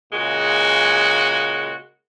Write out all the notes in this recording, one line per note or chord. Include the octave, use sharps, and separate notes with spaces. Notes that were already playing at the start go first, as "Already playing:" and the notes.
A#2 C#3 G#3 F#4